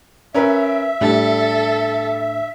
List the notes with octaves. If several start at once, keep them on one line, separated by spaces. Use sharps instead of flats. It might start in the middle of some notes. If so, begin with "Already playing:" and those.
C#4 A#4 B4 E5
A2 G3 D4 A4